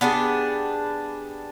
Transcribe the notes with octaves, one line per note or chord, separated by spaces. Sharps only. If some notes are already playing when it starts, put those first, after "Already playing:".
B3 D4 G4 G#4